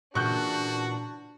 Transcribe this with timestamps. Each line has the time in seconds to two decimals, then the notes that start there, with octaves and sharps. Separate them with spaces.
0.15 A#2 C#3 E3 D4 F#4 C#6 F#6 G6